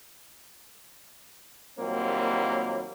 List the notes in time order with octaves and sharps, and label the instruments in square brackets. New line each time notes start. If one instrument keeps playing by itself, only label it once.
[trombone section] D#2 A#2 F#3 G3 A#3 C4